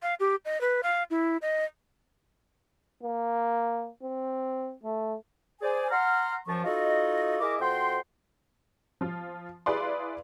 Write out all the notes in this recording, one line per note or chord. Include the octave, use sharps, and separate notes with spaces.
F5
G4
D#5
B4
F5
E4
D#5
A#3
C4
A3
G#4 C5 D5 G#5
F#5 A#5 C6 F6
F#2 F3 A5 C#6
D#4 F4 F#4 A4 D#5
E4 G#4 A#4 D#5 E5 D6
F2 F#4 C5 G5 C6
F3 F4
E4 G#4 B4 D5 F5 C6